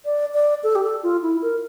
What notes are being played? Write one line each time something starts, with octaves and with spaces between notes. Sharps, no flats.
D5
D5
A4
G4
A4
F4
E4
A#4